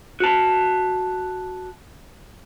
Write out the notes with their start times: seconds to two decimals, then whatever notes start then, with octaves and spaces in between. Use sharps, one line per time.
0.20 F#4 A5